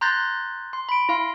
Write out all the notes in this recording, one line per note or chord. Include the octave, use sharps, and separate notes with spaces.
A#5 C6 F#6 G6 A6 A#6
C6
B5 D7
E4 F5 C6